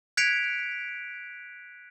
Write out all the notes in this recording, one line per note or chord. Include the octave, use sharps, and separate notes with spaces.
F#6 G#6 B6 C#7 D7 F7